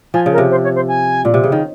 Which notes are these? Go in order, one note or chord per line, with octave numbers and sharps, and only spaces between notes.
F3 G#5
C#3
A#4
C3
C5
C#5
C5
G#5
A#2
C3
C#3
D#3